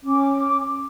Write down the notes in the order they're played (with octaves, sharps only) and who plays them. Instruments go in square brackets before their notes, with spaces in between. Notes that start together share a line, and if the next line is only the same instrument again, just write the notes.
[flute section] C#4 D6